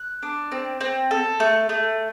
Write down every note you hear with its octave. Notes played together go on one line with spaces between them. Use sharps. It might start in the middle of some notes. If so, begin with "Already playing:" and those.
Already playing: F#6
D4
C4
C4
A4
A3
A3